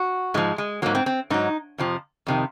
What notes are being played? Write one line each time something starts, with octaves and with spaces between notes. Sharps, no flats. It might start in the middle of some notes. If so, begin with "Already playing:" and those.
Already playing: F#4
G#2 F3 G#3
G#3
G#2 F#3 A#3
C4
C4
G#2 F#3 D#4
F2 C3 F3
F2 C3 D#3